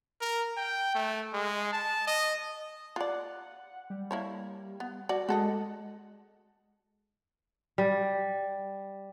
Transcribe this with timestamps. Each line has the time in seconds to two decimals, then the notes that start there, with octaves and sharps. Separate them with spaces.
0.21 A#4
0.57 G5
0.95 A3
1.34 G#3
1.73 A5
2.07 D#5
2.96 F4 D5 F#5
3.90 G3
4.11 A#3 E4 C#5
4.80 B3
5.09 F#4 D5
5.29 G#3 F#4 A4 D#5
7.78 G3